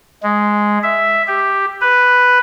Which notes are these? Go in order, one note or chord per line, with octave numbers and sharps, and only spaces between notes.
G#3
E5
G4
B4